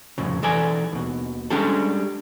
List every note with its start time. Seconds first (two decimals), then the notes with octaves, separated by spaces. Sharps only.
0.18 C2 F2 A2 C#3
0.42 B1 E3 A4 D5 G#5
0.93 D#2 B2
1.50 G3 G#3 C#4 D4 G4 A4